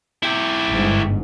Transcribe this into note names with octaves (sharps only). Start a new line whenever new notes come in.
E4 G4
G1 G#2